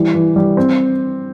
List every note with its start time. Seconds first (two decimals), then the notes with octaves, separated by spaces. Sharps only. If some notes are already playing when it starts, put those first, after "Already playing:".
Already playing: E3 G3
0.14 E3
0.36 G3
0.57 C4